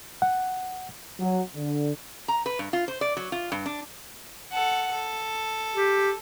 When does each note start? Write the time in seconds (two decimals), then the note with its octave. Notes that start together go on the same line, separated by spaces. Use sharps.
0.22 F#5
1.20 F#3
1.55 D3
2.28 A#5
2.46 B4
2.59 G2
2.73 F4
2.88 C5
3.01 D5
3.17 F#3
3.32 F4
3.52 G2
3.66 D4
4.52 A4 F#5
4.92 A4
5.75 G4